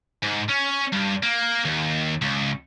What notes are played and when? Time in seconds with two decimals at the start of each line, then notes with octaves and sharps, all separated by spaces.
0.23 G#2
0.48 C#4
0.92 G2
1.23 A#3
1.65 D#2
2.21 C#2